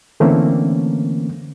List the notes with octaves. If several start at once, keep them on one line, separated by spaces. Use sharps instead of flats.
D3 E3 A3 A#3 C4 C#4